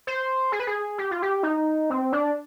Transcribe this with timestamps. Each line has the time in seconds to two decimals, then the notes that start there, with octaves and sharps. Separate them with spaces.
0.07 C5
0.52 G#4
0.60 B4
0.67 G#4
0.98 G4
1.11 F4
1.22 G4
1.43 D#4
1.90 C4
2.13 D4